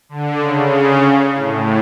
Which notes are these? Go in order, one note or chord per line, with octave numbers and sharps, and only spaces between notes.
D3
C#3
A2